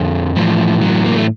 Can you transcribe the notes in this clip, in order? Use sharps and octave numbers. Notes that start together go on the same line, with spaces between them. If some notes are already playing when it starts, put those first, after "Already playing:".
Already playing: F2 D3 F3
A2 E3 F3
F#3
A#3
A3